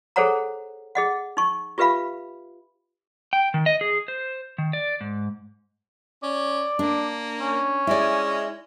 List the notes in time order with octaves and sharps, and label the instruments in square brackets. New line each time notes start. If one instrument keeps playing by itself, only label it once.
[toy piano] G#4 A4 C5 C#5 F#5 A#5
G#4 D#5 F#5
D#4 C#6
F4 G4 B4 E5 F5 B5
[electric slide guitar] G5
D#3
D#5
G#4
C5
D#3
D5
G#2
[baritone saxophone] C#4 [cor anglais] D5
[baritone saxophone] A#3 [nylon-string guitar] D4
[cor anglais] C#4
[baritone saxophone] G#3 [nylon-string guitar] E4 D5